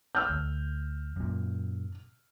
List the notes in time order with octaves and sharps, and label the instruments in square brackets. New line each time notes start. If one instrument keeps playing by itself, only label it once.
[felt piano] E6 F6 G6
[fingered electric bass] D2
F#2 A#2